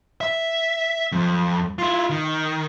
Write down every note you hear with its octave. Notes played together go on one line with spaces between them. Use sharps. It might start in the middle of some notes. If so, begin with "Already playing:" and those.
E5
F2
E4 F4
D#3